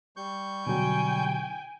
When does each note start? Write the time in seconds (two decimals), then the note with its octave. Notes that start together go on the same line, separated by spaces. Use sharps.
0.17 G3 C#6 G6
0.67 B2 D3 F#3 G5 G#5